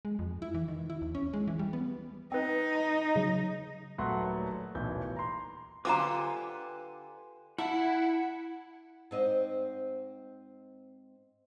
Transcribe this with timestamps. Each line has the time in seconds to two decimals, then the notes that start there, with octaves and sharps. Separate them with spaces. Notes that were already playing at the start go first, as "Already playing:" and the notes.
0.05 G#3
0.19 F2
0.42 E4
0.54 E3
0.68 D#3
0.90 E4
1.02 D#2
1.15 C#4
1.33 G#3
1.48 E3
1.59 G3
1.73 B3
2.32 C4 D#4 B4
2.75 A#5
3.16 C#3 F#3
3.98 D#1 F#3 A3 B4 F#5 C6
4.75 D#1 B1 A2 E3 G6
5.16 A#5 C6
5.85 D3 F4 G4 B4 G#5 A#5 C6 D6
7.58 E4 F#5 A5
9.11 G#2 C4 D#5